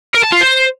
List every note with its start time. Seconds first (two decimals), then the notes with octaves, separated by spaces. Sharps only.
0.14 A#4
0.23 A5
0.32 F4
0.41 C5